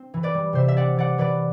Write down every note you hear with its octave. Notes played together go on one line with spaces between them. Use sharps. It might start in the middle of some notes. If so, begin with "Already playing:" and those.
Already playing: C4
E3
B4 D5
G3
C3 C5 E5
E5
C4 D5 F#5
E3 D5 F#5
E3 B4 D5